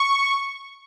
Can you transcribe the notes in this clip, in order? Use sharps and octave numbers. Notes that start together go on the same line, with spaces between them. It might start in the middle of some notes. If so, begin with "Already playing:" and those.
Already playing: C#6